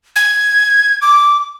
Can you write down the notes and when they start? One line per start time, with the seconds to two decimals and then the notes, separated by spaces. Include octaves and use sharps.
0.16 G#6
1.02 D6